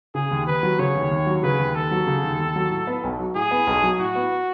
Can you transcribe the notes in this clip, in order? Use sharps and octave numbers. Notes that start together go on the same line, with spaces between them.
C#3 G#4
D#2
D#2 B4
F#3
C#3 C#5
D#2
D#2
F#3
C#3 B4
D#2
D#2 A4
F#3
C#3
D#2
D#2
F#3
A2
B3
B1
F#3
A2 G#4
B3
B1
F#3
A2 F#4
B3